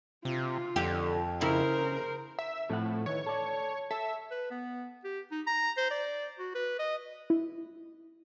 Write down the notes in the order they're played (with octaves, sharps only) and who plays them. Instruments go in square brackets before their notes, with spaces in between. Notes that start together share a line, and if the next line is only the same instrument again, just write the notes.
[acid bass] C3 [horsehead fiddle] F4
[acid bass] F2 [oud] D3 G4
[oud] C#3 E4 [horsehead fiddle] A#4 C5
[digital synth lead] E5
[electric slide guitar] F2 F3 F#5 [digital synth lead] A2
[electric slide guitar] D#3 E3 [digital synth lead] C#5
[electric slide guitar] A4 D5
[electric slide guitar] A4 [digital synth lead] E5
[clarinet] B4
B3
G4
D#4
A#5
C5
D5
F#4
B4
D#5
[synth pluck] E4